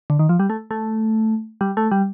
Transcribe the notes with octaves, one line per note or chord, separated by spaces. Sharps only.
D3
D#3
F3
G3
A3
A3
G3
A3
G3